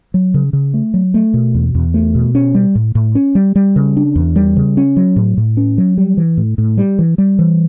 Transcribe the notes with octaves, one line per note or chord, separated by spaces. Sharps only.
F#3
C#3
C#3
A3
F#3
A3
B2
E2
E2
A3
B2
C#4
G3
A2
A2
C#4
G3
G3
C#3
D4
E2
G3
C#3
C#4
F#3
A2
A2
C#4
F#3
G3
E3
A2
A2
G3
E3
G3
E3